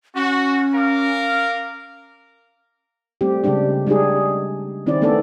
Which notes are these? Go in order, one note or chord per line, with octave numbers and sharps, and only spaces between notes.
C#4 F#4
A#4 F5 D6
G3 A3 C4 G4
C#3 G3 G#3 D4 G4
G3 G#3 D4 D#4 G4 G#4
D#3 C4 C#4 E4 D5
A3 B3 D4 A4 D5